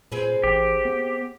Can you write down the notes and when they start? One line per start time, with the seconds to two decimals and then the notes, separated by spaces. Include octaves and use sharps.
0.12 A#2 C4 G#4 B4
0.44 A1 G4
0.85 B3